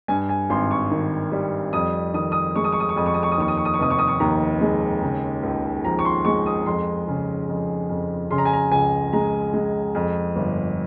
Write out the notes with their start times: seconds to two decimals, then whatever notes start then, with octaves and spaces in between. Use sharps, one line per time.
0.08 G2 G#5
0.29 G#5
0.50 G#1 C6
0.71 C#6
0.91 D#3
1.32 G3
1.73 F2 D#6
2.14 D#3 D#6
2.32 D#6
2.56 G#3 C#6
2.64 D#6
2.72 C#6
2.80 D#6
2.89 C#6
2.96 F2 D#6
3.06 C#6
3.14 D#6
3.23 C#6
3.32 D#6
3.38 D#2 C#6
3.48 D#6
3.57 C#6
3.65 D#6
3.74 C#6
3.79 F1 D#6
3.90 C#6
3.99 D#6
4.08 C#6
4.20 D#2 A#5
4.61 G#3
5.02 C#3
5.43 C#2
5.84 F3 A#5
5.99 C#6
6.05 C6
6.25 G#3 C#6
6.46 D#6
6.66 F2 C6
7.07 C#3
7.49 F2
7.90 F2
8.31 C#3 C6
8.38 A#5
8.45 G#5
8.53 A#5
8.71 C#2 G#5
9.13 G#3 A#5
9.54 G#3
9.95 F2
10.36 G1